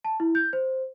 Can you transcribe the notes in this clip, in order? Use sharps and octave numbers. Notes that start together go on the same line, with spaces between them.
A5
E4
G6
C5